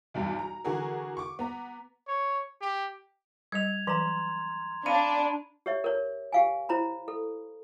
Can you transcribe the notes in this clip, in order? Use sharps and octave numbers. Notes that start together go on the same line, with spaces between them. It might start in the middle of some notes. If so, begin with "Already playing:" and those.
B1 E2 G2
A#5
D3 E3 F#4 G#4 A#4
C#6 D6
B3 A#5
C#5
G4
G3 D#5 G#6 F7
E3 F#3 A#5 C6
D4 D5 F5 B5 D#7
G4 C#5 E5
A#4 C#5
G4 F5 G#5
E4 C5 A#5 B5
A4